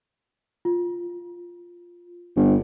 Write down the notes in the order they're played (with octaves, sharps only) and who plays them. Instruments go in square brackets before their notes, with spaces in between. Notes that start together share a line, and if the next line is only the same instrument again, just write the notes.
[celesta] F4
[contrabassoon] G1